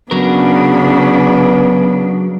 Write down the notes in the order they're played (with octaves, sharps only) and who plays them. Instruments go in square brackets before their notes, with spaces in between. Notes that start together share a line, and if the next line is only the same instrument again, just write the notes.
[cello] C#3 D4 [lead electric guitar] F#3 A#4 [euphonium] B3